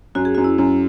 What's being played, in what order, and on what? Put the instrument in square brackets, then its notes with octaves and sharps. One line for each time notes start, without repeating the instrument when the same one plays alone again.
[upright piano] F#2 [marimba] F#4
[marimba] G#4
[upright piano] F#2 [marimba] F#4
[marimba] E4
[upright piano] F#2